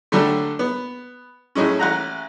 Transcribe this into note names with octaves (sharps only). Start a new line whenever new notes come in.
D3 F#3 G3 A3
B3
A2 F#3 G#3 C#4
A1 F#5 A#5